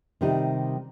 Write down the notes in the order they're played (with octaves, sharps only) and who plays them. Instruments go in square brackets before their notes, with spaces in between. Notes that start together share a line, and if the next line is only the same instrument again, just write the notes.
[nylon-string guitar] C3 D#3 G3 D#4